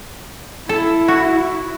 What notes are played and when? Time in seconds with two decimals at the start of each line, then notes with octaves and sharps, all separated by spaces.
0.69 E4 A4
1.08 F#4